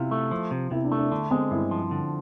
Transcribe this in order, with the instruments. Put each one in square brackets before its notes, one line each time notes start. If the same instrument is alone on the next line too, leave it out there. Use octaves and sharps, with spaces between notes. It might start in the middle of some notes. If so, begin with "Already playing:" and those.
Already playing: [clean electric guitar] C3 [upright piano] E4 F4
[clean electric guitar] A3
F3
C3
[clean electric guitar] C3 [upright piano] E4
[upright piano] D4
[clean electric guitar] A3
[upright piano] D4
[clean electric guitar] D3 [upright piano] D4
[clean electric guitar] G#3 [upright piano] C4
[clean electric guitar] G2 [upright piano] E4
[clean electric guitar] F3
D3